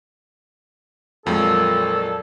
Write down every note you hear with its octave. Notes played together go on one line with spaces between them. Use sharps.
F2 A#2 F#3 G#3 A4